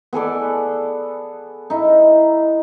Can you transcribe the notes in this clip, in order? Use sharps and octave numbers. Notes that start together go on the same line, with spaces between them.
B3 G#4 A4 D5
D#4 E4